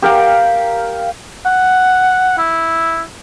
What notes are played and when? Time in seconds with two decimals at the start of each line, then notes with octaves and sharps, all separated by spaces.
0.02 G4 A#4 F5 G5
1.46 F#5
2.38 E4